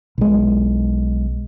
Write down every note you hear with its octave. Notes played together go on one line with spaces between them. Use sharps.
B1 G#3